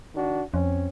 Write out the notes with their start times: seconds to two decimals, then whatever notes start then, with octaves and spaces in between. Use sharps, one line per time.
0.15 D#3 D4 F#4
0.54 F2 C4 C#4